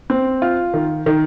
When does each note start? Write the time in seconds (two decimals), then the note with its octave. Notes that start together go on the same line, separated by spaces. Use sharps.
0.10 C4
0.42 F4
0.74 D#3
1.06 D#3